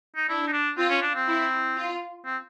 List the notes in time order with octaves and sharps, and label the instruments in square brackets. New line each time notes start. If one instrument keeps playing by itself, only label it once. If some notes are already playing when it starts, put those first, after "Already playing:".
[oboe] D#4
[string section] D4 [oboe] E4
[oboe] D#4
D4
[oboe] C4 [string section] F4
[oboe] C#4
D4
C4
[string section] E4
F4
[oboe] C4